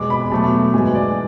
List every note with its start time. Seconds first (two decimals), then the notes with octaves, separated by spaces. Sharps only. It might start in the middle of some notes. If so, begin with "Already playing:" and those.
Already playing: E2 B2 G#3 D6
0.10 B5
0.31 B2 F#3 A3 A5
0.73 G#2 E3 G#3 G#5
0.95 D5